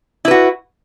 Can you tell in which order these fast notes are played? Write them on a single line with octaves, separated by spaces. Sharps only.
E4 B4 F#4